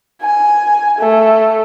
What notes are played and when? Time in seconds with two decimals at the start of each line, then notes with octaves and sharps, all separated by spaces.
0.22 G#5
0.99 A3